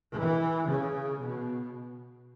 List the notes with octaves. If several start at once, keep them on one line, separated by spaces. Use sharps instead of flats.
E3
C#3
B2